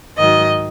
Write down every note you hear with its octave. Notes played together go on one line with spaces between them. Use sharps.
G#2 D#3 F#3 D#5